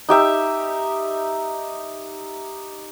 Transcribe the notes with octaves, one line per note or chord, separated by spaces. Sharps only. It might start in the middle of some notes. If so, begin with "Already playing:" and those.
D#4 G4 E5